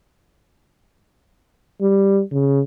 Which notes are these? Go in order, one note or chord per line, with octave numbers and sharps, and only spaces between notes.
G3
C#3